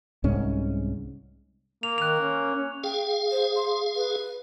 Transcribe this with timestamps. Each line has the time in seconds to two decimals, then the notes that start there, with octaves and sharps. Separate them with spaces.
0.24 C2 G#2 C#4
1.83 A#3 F7
1.98 D#3 F#6 F7
2.19 C#4
2.55 C#4
2.84 G#4 F5 G5
3.32 C5
3.56 C6
3.96 B4